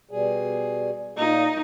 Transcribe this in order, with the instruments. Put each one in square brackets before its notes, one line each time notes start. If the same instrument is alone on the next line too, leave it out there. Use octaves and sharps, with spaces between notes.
[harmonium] B2 G3 G#4
[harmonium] A#2 A#3 F4 [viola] D#4